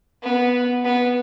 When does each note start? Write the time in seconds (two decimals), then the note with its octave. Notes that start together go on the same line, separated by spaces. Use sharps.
0.22 B3
0.84 B3